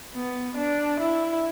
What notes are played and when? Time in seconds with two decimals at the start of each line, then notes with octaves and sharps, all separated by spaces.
0.15 B3
0.57 D4
1.00 E4